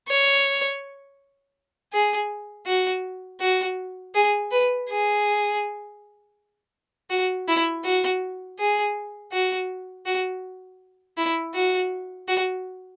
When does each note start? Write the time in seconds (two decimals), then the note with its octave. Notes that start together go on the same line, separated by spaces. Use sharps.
0.08 C#5
1.93 G#4
2.66 F#4
3.40 F#4
4.15 G#4
4.51 B4
4.89 G#4
7.10 F#4
7.48 E4
7.84 F#4
8.59 G#4
9.32 F#4
10.06 F#4
11.17 E4
11.54 F#4
12.28 F#4